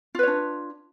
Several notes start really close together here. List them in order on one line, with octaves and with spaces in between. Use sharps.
F4 B4 C#5 D4